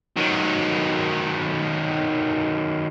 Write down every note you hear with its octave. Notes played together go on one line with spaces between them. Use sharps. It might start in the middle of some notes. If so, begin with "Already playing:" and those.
D#3 F#3